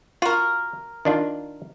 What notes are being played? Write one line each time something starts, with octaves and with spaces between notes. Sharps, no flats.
F4 F#4 A#4
D#3 D4 F4